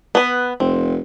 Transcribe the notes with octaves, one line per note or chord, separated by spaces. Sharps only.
B3 B4
F1 C4